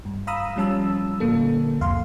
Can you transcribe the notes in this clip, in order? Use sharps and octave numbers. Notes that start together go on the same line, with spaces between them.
G2
F5 A#5 B5 D#6 E6
F3 G3 C#4 A5 E6
A#2 D3 A#3 A4
C2 F2 F5 C6